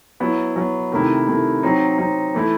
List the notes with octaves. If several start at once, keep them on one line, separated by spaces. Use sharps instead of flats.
F#3 B3 E4
F#3 B3 E4
C3 D#3 A3 E4
C3 D#3 A3 E4
F#3 C4 D#4
F#3 C4 D#4
E3 A3 E4